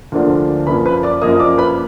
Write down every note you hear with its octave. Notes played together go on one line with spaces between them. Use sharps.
D2 D3 F3 A#3 D4
F#2 F3 A#3 B4 B5
B4 B5
D5 D6
F#2 F3 A#3 D#5 D#6
D5 D6
B4 B5